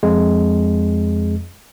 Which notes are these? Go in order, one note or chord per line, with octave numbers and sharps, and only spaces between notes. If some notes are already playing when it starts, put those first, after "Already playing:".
F2 G#3